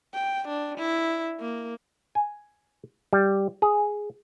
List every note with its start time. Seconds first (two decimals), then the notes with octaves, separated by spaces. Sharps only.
0.14 G5
0.48 D4
0.78 E4
1.40 A#3
2.15 G#5
3.13 G3
3.62 G#4